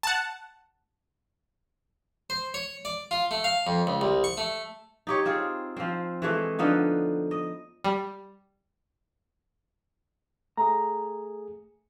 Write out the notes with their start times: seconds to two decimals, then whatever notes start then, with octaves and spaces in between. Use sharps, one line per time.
0.03 F#5 A5
2.30 C5
2.54 C#5
2.85 D5
3.11 F4
3.31 A3
3.44 F5
3.67 F2
3.87 C#2
4.01 C2
4.24 C#6
4.38 A3
5.07 D#4 G4 C#5
5.25 C4 F4 G#4
5.77 F3 C4
6.22 E3 G#3 A3
6.59 D3 F3 B3 D#4
7.31 D#5
7.84 G3
10.57 A3 G#4 A#5